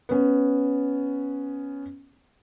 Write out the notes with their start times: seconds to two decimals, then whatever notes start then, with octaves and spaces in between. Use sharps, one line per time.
0.09 B3 C#4